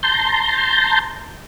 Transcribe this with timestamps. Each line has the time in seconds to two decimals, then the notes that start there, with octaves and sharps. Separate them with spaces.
0.03 A5 A#5 C6 G6